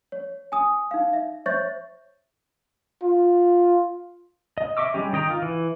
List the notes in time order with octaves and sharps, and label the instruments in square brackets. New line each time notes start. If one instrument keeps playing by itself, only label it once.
[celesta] C#5
G#5 D#6
D#4 F5
E5
C5 C#5 E5 C#6 G6 A6
[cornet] F4
[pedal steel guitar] D#5
D#5 E5 C#6 D6 E6
G3 G#3 C#4 G4
D#3 D#5 G5 A#5
F4
E3